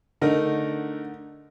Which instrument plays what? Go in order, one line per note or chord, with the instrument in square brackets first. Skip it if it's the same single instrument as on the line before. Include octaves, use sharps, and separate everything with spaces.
[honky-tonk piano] D3 [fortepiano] A3 D#4 A#4